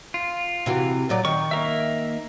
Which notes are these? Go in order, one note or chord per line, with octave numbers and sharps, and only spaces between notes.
F4
C3 E3 F#4
A#2 F#3 D5
D#3 C#6
A#3 A#4 E5